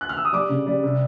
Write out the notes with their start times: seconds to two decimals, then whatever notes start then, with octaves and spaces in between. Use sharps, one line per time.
0.01 F#6
0.09 F6
0.17 E6
0.25 D#6
0.33 G3 D6
0.49 C#3
0.66 G3
0.83 C3